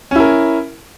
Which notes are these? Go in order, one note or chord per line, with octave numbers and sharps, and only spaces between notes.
C#4 E4 A#4